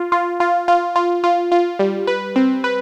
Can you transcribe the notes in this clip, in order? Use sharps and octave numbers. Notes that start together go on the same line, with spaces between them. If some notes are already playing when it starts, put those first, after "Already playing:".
Already playing: F4
F4
F4
F4
F4
F4
F4
G3
B4
C4
B4